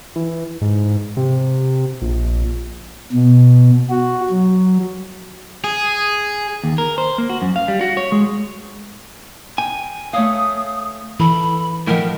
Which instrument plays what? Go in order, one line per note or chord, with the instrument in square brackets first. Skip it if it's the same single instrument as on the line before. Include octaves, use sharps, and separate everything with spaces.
[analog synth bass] E3
G#2
C3
A#1
[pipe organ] B2
F#4
F#3
[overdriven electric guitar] G#4
[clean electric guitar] D#2
A#4
C5
A#3
F#4
F#2
F5
G3
F#4
C#5
G#3
[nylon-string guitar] G5 [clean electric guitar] G#5
[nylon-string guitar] A3 C#5 F5 [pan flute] D#6
[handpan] E3 E4 [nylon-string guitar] A4 [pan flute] B5
[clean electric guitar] A2 F3 [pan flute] A#4 [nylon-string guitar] D#5 F#5 G5